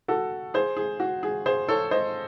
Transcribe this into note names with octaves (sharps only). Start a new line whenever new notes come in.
F#4 A4
G#4 C5
G#4
F#4
G#4
G#4 C5
A4 C#5
C5 D#5